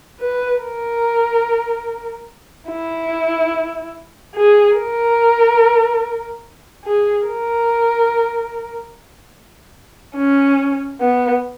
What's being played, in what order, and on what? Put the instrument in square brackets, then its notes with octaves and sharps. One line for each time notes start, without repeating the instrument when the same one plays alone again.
[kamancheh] B4
A#4
E4
G#4
A#4
G#4
A#4
C#4
B3